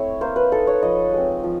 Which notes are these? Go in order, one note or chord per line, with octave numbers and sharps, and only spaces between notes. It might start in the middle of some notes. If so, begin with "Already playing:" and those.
Already playing: A3 C4 E4 C#5
A#3 C5
B4
D#4 A4
C#5
F3 D#5
G#3 C4
F3